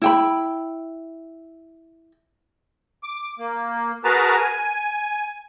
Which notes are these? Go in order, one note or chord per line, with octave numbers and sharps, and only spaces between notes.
E4 G5 B5
D6
A#3
F#4 G#4 A#4 B4 A5 A#5
G#5